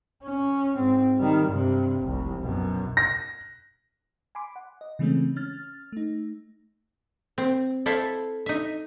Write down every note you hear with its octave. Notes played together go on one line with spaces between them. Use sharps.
C#4
G#2 C4
D#3 G3
G2 C3
F1 C2
F#2 B2
A#6
G#5 B5 C6 D6
F#5
D#5
C#3 E3 G#3 A3 C4 C#4
C#4 F6 A6
A3 D#4
C4
E4 A4 C5 E5 F5
D#4 E5